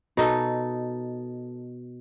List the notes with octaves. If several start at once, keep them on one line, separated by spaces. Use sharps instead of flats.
B2 D#4 A4